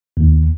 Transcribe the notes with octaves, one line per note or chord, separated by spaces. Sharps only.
D#2